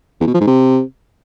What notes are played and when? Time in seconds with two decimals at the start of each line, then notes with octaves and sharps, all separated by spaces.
0.21 E2
0.27 B2
0.34 F3
0.41 G#2
0.47 C3